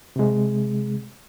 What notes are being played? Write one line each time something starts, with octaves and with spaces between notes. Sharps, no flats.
C3 G#3